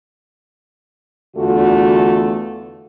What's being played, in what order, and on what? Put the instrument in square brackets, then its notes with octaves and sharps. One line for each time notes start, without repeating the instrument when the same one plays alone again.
[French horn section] E2 D3 A3 F4 F#4